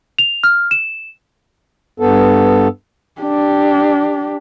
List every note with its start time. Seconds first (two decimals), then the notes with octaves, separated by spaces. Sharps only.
0.19 F7
0.44 F6
0.71 E7
2.00 G2 B3 A4
3.21 D4 G4